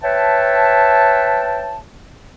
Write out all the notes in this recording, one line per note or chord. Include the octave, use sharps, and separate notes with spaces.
B4 C#5 E5 G5 A5